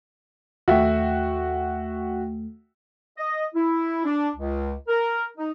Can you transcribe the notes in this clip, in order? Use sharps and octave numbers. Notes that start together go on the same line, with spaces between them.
D#2 A3 F#4 E5 G5
D#5
E4
D4
C#2
A#4
D#4